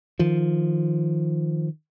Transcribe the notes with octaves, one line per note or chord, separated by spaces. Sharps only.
D#3 F3